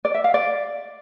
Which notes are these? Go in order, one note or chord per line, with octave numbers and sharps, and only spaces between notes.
D5
E5
F5
D5